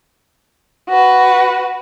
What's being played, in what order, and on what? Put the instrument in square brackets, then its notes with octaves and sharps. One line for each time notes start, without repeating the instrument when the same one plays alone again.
[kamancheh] F#4 B4